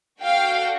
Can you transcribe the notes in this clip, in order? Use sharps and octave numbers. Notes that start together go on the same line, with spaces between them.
D4 F#4 A4 F5 G5